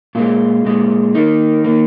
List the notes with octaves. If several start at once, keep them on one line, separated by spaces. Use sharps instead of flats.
A#2 G#3 F4
A#2 G#3
D#3 A#3 D#4
D#3 A#3